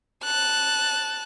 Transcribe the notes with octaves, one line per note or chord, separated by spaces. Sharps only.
A5 F#6